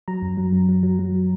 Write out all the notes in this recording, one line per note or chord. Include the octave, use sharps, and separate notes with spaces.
F#3 A#5
F#2
F#3
F#2
F#3
F#3
F#3